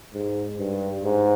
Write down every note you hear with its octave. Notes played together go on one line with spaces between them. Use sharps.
G#2
G2
G#2